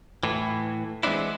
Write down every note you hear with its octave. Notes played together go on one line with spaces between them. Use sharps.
A2 E3
E3 G#3 B3 C4 D4 E4